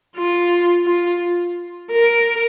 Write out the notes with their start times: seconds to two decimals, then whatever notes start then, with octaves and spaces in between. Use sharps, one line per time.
0.17 F4
0.86 F4
1.92 A#4